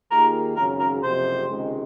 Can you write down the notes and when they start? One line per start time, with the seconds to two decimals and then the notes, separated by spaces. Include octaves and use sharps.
0.11 D#2 D#3 A#3 F4 G#4 A#4
0.56 G#1 F#2 C#3 A#4
0.80 A#4
1.03 F#1 F2 C3 C5
1.48 C#2 C3 D#3 G#3